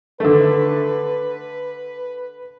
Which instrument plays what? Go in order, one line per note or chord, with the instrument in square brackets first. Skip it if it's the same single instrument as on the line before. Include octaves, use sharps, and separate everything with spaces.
[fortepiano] D3 A3 [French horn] B4